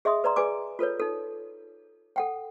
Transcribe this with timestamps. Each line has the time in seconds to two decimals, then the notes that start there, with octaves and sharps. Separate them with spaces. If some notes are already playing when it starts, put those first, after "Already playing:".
0.05 G#4 D#5 E5 C6 D#6
0.24 B4 D5 A#5 C6
0.36 G#4 B4 D5 G#5 D6
0.79 F4 A4 B4 C#5
0.99 D#4 A4
2.16 A4 F#5 G5